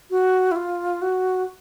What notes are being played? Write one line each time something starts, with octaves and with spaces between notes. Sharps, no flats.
F#4
E4
F4
F#4